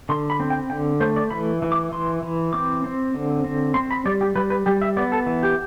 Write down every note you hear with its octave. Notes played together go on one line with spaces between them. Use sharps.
D3 C6
B5
C4
G5
D3 G5
A3 C5
D5
E3 B5
E3
D6
E3 C6
E3
C4 D6
C4
D3
C4
C4 C6
B5
G3 D5
G4
G3 B4
B4
G3 G4
E5
B3 D5
A4
E3
G4